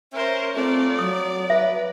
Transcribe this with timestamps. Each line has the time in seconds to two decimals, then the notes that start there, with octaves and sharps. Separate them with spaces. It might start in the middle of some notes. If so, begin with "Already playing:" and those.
0.13 C#4 A#4 C5 E5
0.56 A3 C4 F4 D5
0.99 F#3 D#6
1.50 B4 E5